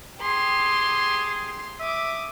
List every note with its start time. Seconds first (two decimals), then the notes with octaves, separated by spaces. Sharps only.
0.21 G4 G#4 C6
1.80 E5 D6 D#6